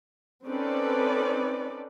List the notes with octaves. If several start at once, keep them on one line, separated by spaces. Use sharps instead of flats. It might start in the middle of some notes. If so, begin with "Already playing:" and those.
C4 C#4 D#4 A4 B4 D5